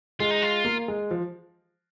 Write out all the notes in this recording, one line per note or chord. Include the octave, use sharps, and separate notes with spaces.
G#3 F4
D#4
F4
A#3
G#3
F3